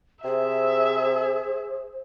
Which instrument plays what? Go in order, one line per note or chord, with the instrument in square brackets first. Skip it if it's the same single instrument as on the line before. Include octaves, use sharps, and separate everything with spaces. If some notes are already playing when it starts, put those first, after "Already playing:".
[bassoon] C3 [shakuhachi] G#4 [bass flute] C5 [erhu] E5